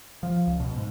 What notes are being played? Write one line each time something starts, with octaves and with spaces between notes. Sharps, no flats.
F3
C#2
B2
G#2